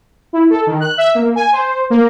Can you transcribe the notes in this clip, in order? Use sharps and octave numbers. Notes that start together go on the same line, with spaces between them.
E4
A4
D#3
F#6
E5
A#3
G#5
C5
A#3